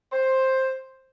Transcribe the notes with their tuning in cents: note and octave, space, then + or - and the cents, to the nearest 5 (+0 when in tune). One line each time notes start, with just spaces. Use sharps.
C5 +10